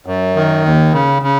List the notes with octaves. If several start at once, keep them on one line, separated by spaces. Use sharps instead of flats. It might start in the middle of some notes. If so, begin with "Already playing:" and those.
F#2
D#3
D#2
C#3
C#3